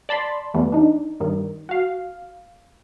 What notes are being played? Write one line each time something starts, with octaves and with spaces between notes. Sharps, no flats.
D5 A5 B5 C6
E2 E3 G3 A3 B3
D4 D#4
G2 D#3
F#4 F5